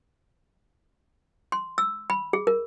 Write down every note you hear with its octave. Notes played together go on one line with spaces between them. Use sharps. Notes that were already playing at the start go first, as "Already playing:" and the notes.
C6
E6
B5
G#4
A#4